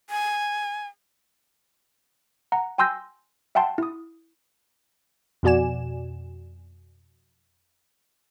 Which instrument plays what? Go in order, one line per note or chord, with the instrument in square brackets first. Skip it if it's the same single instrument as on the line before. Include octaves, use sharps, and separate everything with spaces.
[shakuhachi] G#5
[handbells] F#5 A#5
G5 G#5 C6 E6 G6 A#6
E5 F#5 G5 A5 C6
E4 D#6
[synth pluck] F2 B2 F#4 D5 G#5 E7